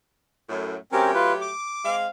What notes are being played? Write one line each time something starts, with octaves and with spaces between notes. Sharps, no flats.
F#2 A2
F#3 A3 C4 C#4 G4 A#4
F4 B4
D6
G#3 C4 F5